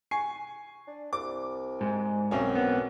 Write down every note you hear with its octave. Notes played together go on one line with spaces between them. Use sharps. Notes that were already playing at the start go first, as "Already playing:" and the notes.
G#5 C#6 C7
D4
C2 D6
G#2
B1 F#2 C4 C#4
B3